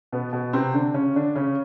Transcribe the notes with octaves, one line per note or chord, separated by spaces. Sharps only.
B2 B3
B2 B3
C3 C4
D3 D4
C#3 C#4
D3 D4
C#3 C#4